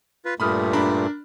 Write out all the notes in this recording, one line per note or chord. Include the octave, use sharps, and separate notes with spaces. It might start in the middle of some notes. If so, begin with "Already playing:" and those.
F4 B4
G2 A#2 A3 B5 D#6 F6
D4 A#4 B5